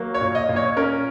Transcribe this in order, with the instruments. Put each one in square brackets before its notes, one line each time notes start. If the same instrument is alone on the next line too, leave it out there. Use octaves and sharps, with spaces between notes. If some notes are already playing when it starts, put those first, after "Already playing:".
Already playing: [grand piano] F#3 A#3
C#5
A#2
D#5
A#2
C#5
C#4 A#4